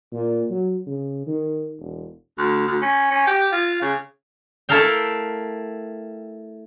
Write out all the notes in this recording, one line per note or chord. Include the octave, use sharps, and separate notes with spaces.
A#2
F#3
C#3
D#3
E1
D2
D2
C#4
C#4
G4
F4
C#3
A3 E4 A4 A#4 F5 G5